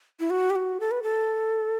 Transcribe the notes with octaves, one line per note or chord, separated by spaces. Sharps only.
E4
F#4
G4
F#4
A4
B4
A4